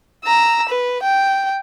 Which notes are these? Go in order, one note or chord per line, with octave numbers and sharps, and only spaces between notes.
A#5 E6
B4
G5